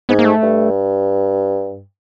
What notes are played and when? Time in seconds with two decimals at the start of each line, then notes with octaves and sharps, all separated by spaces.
0.09 G#2 B3
0.19 A#3
0.25 A3
0.43 G2